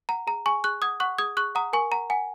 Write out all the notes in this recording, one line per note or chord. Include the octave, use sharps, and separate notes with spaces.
F#5 A#5
G#4 A#5
G#4 G#5 C#6
G#4 C#6 F#6
F#5 D#6 G#6
F#5 C#6 F#6
G#4 D#6 G#6
G#4 C#6 F#6
F#5 A#5 D#6
A#4 G#5 C#6
F#5 A#5
F#5 G#5